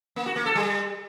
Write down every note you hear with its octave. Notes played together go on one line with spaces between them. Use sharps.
A#3
F#4
A#3
A4
G3